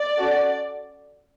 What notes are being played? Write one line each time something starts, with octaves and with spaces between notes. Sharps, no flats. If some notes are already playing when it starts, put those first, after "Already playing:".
Already playing: D5
C#4 F#4 A4